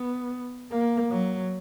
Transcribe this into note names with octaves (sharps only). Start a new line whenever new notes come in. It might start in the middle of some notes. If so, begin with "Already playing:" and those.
Already playing: B3
A#3
F#3